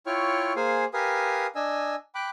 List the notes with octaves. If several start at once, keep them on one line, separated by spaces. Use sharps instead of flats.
E4 F4 C#5 G5 C#6 F6
A#3 G#4 C5 F5 G#5
G4 A#4 B4 F5 G#5 D#6
D4 D#5 G#5 E6
G5 B5 D6 F#6